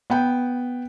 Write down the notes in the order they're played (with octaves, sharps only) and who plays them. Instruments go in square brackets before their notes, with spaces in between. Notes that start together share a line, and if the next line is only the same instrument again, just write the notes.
[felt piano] B3 G5